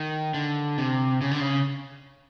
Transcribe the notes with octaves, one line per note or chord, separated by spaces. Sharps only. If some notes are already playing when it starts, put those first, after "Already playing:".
Already playing: D#3
D3
C3
C#3
D3
C#3